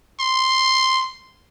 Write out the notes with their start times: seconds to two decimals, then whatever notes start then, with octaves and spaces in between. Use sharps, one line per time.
0.20 C6